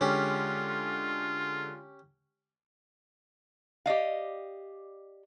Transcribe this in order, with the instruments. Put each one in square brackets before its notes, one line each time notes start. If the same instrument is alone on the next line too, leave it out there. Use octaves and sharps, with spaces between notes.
[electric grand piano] D3 G#3 [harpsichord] C#4 G4 [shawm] F4
[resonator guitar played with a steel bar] G4 D5 D#5 F5